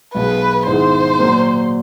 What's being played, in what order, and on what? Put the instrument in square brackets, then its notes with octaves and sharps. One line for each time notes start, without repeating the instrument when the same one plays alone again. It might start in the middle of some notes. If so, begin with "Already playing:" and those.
[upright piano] B1 B2 G#3 [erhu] B4
[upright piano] G#2 D#3 G#3 B3 E4 [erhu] C5
[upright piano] A#2 F#3 A#3